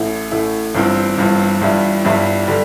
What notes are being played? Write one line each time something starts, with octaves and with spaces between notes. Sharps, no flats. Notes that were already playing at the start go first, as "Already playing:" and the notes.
Already playing: A1 A2 A3 E4
A1 A2 A3 E4
G1 G2 E3 C4
G1 G2 E3 C4
G1 G2 E3 G3 E4
G1 G2 E3 G3 E4
D3 G3